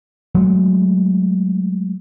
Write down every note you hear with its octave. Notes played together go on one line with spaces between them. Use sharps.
F#3 G#3 A3